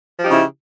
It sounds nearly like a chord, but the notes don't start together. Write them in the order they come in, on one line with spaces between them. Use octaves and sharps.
F3 G4 D#4 C#3 E4